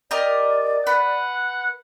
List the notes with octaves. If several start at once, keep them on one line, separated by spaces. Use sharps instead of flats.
G4 A#4 D5 D#5
B4 F#5